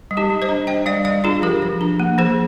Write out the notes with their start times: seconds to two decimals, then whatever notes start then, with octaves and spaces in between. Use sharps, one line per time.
0.11 G3
0.17 D#4 G4
0.30 G3
0.42 C5 D#5
0.49 D4
0.67 D4 D#5 G5
0.86 G3 D5 F5
1.05 G3 D5 F5
1.24 D4 F4 G#4
1.42 F3 G4 A#4
1.62 F3
1.81 D4
2.00 A#3
2.18 F3 G#4 C5